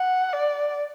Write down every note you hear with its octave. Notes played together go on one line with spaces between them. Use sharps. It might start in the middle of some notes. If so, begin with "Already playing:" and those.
Already playing: F#5
D5